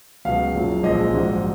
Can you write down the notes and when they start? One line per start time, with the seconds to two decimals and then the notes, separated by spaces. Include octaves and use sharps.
0.25 C#2 B2 F#3 F5
0.55 F#1 F#2 F3
0.83 A#1 A#2 F3 G#3 D#5
1.13 A#1 G#2 F#3